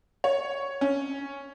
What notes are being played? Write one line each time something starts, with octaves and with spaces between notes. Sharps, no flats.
C#5
C#4